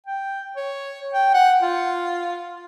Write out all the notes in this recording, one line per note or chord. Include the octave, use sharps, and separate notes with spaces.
G5
C#5
G5
F#5
F4